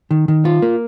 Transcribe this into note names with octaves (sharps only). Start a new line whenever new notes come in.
D#3
D#3
F4
A#3